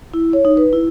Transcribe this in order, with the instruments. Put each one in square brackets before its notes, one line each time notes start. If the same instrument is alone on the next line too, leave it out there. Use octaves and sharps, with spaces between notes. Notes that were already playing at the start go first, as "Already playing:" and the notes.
[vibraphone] E4
C#5
D#4
B4
E4